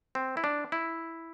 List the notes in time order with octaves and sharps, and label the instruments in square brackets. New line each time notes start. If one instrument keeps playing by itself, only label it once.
[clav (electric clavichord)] C4
E4
D4
E4